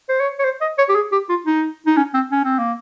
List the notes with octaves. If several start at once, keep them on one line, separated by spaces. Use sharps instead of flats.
C5
C#5
C#5
C5
D#5
C#5
G4
G#4
G4
F4
D#4
D#4
C#4
C4
C#4
C4
A#3